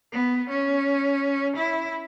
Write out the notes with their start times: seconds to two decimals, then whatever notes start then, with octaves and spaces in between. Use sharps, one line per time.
0.12 B3
0.49 C#4
1.56 E4